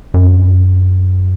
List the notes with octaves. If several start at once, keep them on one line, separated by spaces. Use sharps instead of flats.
F#2